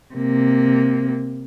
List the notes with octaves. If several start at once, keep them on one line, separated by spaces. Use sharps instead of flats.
C3 A#3